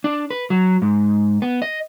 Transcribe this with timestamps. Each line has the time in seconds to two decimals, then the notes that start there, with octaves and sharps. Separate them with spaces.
0.04 D4
0.31 B4
0.50 F#3
0.82 G#2
1.42 B3
1.62 D#5